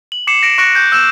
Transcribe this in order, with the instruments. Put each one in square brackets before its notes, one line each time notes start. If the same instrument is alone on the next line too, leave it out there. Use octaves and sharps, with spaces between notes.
[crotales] F#7
D6 C7 C#7 E7
A#6 D7
C#6 F#6 A#6 C#7 D7
G6
E6 G6 E7